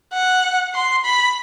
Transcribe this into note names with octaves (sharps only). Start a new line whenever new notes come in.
F#5
C6
B5